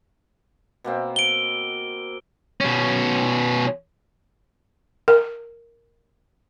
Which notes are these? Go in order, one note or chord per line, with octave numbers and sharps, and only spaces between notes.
B2 A#3 C4
D7 G7
B2 C#4
A#4